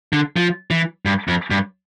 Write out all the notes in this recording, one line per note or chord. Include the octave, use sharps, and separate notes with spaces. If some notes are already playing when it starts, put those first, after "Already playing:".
D3
F3
E3
G2
F2
G2